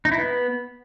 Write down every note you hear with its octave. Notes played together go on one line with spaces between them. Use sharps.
D#4
E4
B3